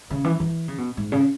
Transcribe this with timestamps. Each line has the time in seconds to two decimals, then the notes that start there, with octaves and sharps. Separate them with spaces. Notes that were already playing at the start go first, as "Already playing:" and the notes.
0.11 C#3
0.24 E3
0.40 E3
0.68 C#3
0.78 B2
0.97 G#2
1.12 C#3